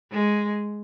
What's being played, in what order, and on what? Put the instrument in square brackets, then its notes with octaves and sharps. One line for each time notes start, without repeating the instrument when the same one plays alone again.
[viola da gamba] G#3